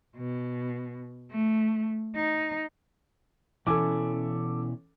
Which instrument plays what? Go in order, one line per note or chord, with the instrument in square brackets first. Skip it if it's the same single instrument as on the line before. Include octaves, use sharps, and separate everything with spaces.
[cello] B2
A3
D#4
[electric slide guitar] B2 E4 G#5 [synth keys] E3 C#4 [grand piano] A4 D6